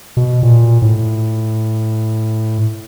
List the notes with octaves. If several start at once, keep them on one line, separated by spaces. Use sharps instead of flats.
B2
A#2
A2